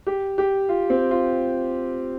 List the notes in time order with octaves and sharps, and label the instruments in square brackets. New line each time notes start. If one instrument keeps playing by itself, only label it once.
[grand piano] G4
G4
F4
C4
F4